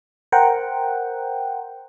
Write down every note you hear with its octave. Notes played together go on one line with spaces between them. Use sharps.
A#4 C5 F#5 G5